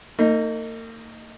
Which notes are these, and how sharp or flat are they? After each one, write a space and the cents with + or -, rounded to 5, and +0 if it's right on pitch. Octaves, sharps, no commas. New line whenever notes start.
A#3 -45 D#4 +0